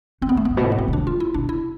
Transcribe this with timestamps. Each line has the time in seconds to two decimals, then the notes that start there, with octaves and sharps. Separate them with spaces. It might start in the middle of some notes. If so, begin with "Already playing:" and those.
0.22 F2 C4
0.29 B3
0.36 F2 A3
0.45 G2 B3
0.57 B2
0.64 A2
0.72 B3
0.78 F2 C4
0.88 B2
0.93 D4
0.98 E3
1.07 F4
1.20 E4
1.34 B2 D4
1.49 E4